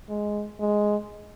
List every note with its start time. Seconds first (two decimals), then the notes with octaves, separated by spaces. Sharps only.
0.09 G#3
0.60 G#3